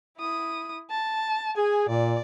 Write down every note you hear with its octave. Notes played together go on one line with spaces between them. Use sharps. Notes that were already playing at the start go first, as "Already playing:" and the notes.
E4 D#6
A5
G#4 G#5
A#2 D5